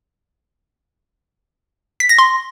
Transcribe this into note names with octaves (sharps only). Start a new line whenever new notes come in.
B6
A#6
C6